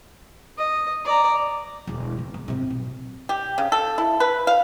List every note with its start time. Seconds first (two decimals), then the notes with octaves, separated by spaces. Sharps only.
0.58 D#5
1.05 D5 A#5
1.87 E1 D2
2.18 C#3
2.34 B3
2.48 G#1 C3
2.70 B1
3.29 G4
3.58 C#3
3.72 A4
3.98 E4
4.20 B4
4.47 F5